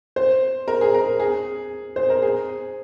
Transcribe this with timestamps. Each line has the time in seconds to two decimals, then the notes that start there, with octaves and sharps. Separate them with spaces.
0.16 C5
0.68 A#4
0.81 G#4
0.94 A#4
1.20 G#4
1.96 C5
2.10 A#4
2.22 G#4